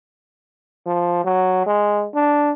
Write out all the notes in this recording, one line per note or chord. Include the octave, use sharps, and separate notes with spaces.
F3
F#3
G#3
D4